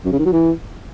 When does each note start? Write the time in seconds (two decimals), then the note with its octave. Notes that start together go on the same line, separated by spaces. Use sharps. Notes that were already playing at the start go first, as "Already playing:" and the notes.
0.05 F#2
0.12 C#3
0.19 D#3
0.26 F#3
0.33 E3